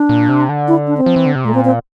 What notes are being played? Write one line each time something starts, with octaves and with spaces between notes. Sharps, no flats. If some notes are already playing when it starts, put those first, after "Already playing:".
Already playing: D4
A#2
C3
D3
E4
D4
C4
F3
E3
D3
C3
A#2 A3
C4
C4